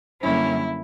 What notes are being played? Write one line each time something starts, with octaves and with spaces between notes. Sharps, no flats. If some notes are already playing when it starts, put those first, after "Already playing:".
F#2 D3 G3 A#3 C#4 E4